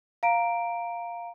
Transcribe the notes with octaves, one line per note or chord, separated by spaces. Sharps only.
F5 A#5 D7